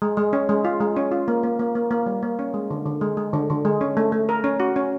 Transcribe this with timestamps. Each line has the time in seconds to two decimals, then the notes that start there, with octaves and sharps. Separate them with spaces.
0.02 G#3
0.17 G#3
0.33 C#4
0.49 G#3
0.65 F4
0.80 G#3
0.96 C#4
1.12 F4
1.28 A#3
1.43 A#3
1.59 A#3
1.75 A#3
1.91 A#3
2.06 G3
2.23 A#3
2.39 C#4
2.54 G#3
2.71 D3
2.86 D3
3.01 G#3
3.17 G#3
3.34 D3
3.50 D3
3.65 G#3
3.81 C#4
3.97 A3
4.12 A3
4.29 A#4
4.44 C#4
4.60 F#4
4.76 C#4